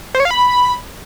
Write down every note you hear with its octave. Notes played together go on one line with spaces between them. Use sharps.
C5
C#5
F5
B5